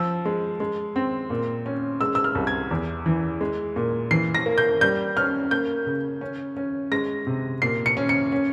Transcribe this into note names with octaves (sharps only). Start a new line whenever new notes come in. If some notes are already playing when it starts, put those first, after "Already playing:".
Already playing: F3 E6
G#3
G#3
C4
A#2
C#4
G#3 E6
E6
F6
C2
G#6
E2
E3
G#3
A#2
E3 C7
A#6
A#3
G6
G3 G6
C#4 F6
A#3 G6
C#3
C#4
C#4
G#3 A#6
C3
A#2 C7
C#7
C#4
C#7
C#4